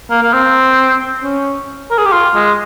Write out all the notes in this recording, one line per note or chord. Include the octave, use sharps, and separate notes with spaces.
A#3
A#3
C4
C#4
A#4
G#4
G4
F4
G#3